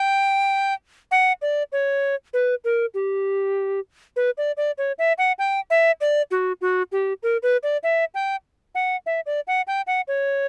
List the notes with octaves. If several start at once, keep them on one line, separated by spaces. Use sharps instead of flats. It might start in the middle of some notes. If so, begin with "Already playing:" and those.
Already playing: G5
F#5
D5
C#5
B4
A#4
G4
B4
D5
D5
C#5
E5
F#5
G5
E5
D5
F#4
F#4
G4
A#4
B4
D5
E5
G5
F#5
E5
D5
F#5
G5
F#5
C#5